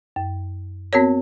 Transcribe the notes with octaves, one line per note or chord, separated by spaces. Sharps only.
F#2
B3 C4 F#4 A#4 C#5